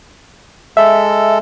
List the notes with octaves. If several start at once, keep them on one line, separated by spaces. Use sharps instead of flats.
G#3 A4 E5